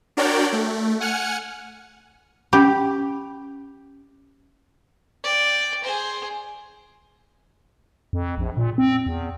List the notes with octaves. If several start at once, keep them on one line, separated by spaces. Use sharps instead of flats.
D4 F#4 A#4 C#5 D5 G5
A3
F#5 G#5 F6 C#7
C#4 G4 B5
D5 G5
G#4 C5
F2
A#1
A#2
C4
E2